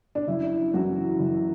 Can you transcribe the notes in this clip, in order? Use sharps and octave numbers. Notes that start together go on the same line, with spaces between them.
D4
F#1 E4
F#2 E3 F#4
F#1